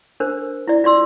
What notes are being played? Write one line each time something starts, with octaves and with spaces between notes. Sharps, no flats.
D4 A#4 C5
E4 D5
F4 D5 C6 E6